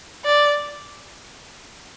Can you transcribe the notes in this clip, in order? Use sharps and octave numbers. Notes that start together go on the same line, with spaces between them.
D5